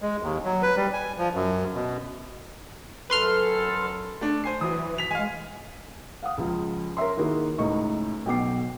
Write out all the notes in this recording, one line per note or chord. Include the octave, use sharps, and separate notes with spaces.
G#3
D#2
F#3
B4
G3
G#5
F3
F#2
B2
F#2 A4 B4 C6 F6
A3 D4
C5 G#5 C7
E3 F#3 D#6
B6 F7
G#3 F5 G#5
F5 F#5 D#6
C#2 F3 F4
A#4 C#5 E5 C6
D#3 A#3 E4 F#4 G#4 A#4
C#2 A2 D#4 D#5 C#6
B1 B2 G5 D6 C7